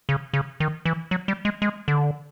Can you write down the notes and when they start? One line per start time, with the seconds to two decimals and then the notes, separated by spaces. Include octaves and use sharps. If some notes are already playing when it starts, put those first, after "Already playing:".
0.09 C#3
0.33 C#3
0.60 D#3
0.85 E3
1.11 F#3
1.28 G3
1.45 G#3
1.62 G#3
1.88 D3